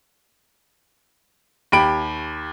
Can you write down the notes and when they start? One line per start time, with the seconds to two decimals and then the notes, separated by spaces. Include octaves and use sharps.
1.72 D#2 G4 B5 D7